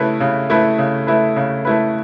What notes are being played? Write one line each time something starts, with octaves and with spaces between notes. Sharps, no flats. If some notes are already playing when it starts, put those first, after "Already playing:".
Already playing: C#3 A3 E4 B4
C#3
A3 E4 B4
C#3
A3 E4 B4
C#3
A3 E4 B4